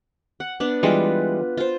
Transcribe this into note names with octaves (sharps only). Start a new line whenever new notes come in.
F#5
B3 D4
E3 G3 G#3 F4 B4
F4 C5